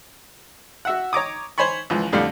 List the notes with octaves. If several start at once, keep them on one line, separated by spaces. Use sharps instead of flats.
F#4 E5 F#5
C#5 A#5 D6 D#6
C5 C#5 G#5 B5 C#6
C#2 E3 F3
F2 A2 D3 G3 F5